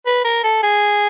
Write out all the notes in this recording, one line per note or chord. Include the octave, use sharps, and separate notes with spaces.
B4
A#4
A4
G#4